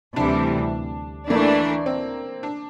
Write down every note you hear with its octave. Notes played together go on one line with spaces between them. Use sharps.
D2 C3 E3 G3 D4
E3 A3 A#3 D4
C4
D4